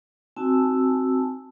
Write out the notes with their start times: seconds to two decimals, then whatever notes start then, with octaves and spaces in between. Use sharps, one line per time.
0.37 C4 D#4 F#4 G#5 A5 E6